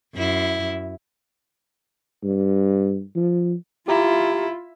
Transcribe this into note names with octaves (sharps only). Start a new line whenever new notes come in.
F#2 E4
G2
F3
E4 F4 G4 A#5